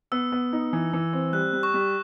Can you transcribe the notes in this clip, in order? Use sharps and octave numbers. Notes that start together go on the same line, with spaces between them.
B3 E6
B3
D#4
E3
E3
C4
G3 F#6
G3
C#6
G3